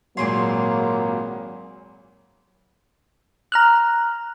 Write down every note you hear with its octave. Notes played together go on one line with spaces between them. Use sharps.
G#1 A#2 F#3 A#3 C4 G#4 C#5 C6
A#5 F6 F#6